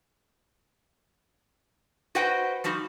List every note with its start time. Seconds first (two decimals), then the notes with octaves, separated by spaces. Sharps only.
2.15 F#4 B4 C5 D#5 F#5 G5
2.64 F3 G3 D#4 F#4